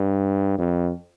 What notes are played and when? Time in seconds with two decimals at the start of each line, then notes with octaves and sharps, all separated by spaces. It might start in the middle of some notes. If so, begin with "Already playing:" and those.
Already playing: G2
0.58 F2